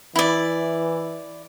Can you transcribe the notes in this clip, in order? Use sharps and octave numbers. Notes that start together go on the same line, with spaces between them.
E3 E4 D5